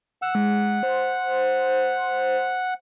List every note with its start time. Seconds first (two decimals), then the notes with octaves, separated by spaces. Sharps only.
0.22 F#5 E6
0.35 G#3
0.83 C5